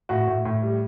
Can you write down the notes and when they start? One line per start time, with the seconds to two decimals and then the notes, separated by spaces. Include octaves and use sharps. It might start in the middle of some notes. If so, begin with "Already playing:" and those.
0.09 A2 F#4
0.27 A2
0.45 A2
0.62 G3